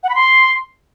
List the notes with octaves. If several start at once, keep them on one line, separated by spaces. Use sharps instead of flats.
F#5
B5
C6